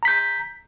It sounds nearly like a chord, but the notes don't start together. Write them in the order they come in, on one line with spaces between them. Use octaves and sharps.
A#5 B6 G6